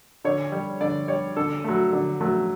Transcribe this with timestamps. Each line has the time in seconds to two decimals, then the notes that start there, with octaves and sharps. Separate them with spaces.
0.25 D3 C#5
0.52 G3
0.81 D3 D5
1.08 G3 C#5
1.36 D3 A4
1.64 F#3 A3
1.92 D3
2.21 F#3 A3